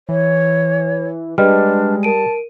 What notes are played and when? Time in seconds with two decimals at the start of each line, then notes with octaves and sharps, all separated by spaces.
0.09 E3 C#5
1.38 G3 G#3 D4 B4 D#5 F6
2.03 A#4 A5 D7 D#7